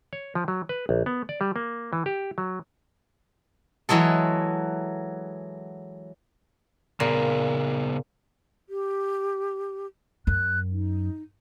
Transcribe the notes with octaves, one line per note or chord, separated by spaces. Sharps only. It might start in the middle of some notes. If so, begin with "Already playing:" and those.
C#5
F3
F#3
B4
A#1
B3
D5
G3
A#3
E3
G4
F#3
E3 F#3 G#3 A4
A#2 C#3 B3 G#4
G4
F#2 F#6
D#4